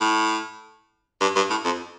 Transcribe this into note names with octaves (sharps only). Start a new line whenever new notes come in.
A2
G2
G2
A2
F2